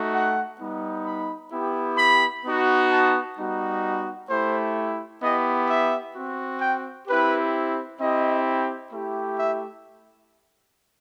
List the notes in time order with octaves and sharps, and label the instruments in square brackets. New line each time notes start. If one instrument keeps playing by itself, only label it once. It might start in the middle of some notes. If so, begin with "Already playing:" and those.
Already playing: [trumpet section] A3 D#4 F#4
F#5
G3 B3 D#4
B5
B3 E4 G4
B5
B3 D#4 F#4
A5
G3 B3 D#4 F#4
A3 E4 G4 C5
B3 E4 G4 D#5
E5
C4 F#4
G5
C4 E4 G4 B4
C4 E4 G4 D#5
A3 E4 G4
E5